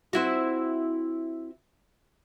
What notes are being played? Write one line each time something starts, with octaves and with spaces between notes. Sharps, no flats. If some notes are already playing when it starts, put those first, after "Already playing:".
C4 E4 F#4